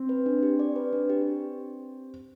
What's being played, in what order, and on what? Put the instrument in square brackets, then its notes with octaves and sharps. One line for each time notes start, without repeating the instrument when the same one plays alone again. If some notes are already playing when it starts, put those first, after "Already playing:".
Already playing: [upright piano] C4
[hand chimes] B4
D4
G4
D5
B4
D4
G4